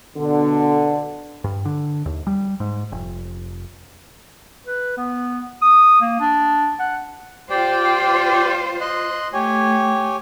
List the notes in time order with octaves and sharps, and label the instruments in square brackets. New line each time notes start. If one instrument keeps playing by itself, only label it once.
[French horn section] B2 D3
[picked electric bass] G2
D3
D#2
G3
G#2
F1
[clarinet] B4
B3
D#6
A#3
D4
F#5
[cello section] F4 C5 [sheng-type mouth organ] G4 D5 G5
[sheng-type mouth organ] D#5 C6 F#6
[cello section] A3 [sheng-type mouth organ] G4 C#5 G#5